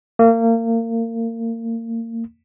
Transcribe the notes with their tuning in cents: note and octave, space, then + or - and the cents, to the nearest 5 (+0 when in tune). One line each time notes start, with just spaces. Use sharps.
A#3 -30